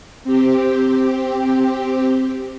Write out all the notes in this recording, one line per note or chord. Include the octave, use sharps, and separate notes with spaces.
C4 G4